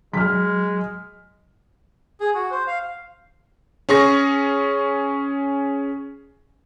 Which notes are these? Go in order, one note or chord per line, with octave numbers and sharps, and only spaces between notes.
F#3 G#3 F6 B6
G#4
F#4
C5
F5
C#4 G#4 C#6 A#6